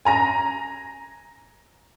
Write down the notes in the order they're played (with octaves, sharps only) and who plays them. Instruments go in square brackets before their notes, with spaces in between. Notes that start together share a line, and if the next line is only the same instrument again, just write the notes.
[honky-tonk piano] G#5 A#5 A#6